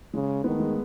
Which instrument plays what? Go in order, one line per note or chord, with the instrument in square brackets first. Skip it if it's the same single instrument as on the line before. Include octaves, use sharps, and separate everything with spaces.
[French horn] C#3 [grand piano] G#3
[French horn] D#3 [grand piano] B3
[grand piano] A3
G#3